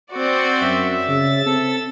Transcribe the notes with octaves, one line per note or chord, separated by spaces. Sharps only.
C4 F#4 D5
F#2 E5
C#3 A6
C4 A4 E6